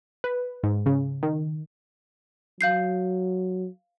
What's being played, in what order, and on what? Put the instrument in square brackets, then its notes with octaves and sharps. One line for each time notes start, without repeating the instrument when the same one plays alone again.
[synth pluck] B4
G#2
C#3
D#3
[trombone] F#3 [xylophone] F5 G6 C7